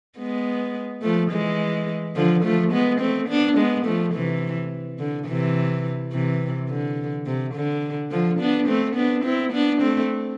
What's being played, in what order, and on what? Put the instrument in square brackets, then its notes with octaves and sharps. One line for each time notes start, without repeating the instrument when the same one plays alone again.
[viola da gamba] G#3 B3
F3 A3
E3 G#3
D3 F3
F3 A3
G#3 B3
A3 C4
B3 D4
G#3 B3
F3 A3
C3 E3
D3
C3 E3
C3 E3
D3
C3
D3
D3 F3
B3 D4
A3 C4
B3 D4
C4 E4
B3 D4
A3 C4